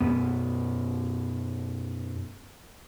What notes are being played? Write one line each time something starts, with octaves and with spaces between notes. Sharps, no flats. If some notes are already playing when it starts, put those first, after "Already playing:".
F#2 B2 B3